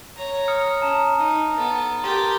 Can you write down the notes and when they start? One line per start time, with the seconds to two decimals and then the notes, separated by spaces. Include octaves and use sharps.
0.17 C#5 A#5
0.48 D#6 F6 C#7
0.82 C#4 A5 A#5 E7
1.19 D#4
1.57 B3 A4
2.04 G4 A#4 C6 A6